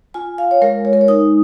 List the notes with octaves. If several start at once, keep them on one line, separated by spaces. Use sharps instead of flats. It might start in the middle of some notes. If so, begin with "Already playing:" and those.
F4 G#5
F5
C#5
G#3 A#4
C#5
A#4
C#5
D#4 D#6